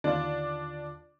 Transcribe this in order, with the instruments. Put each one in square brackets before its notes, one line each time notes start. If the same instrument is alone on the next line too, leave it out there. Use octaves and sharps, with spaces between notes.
[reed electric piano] D#2 D3 F4 [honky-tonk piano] D4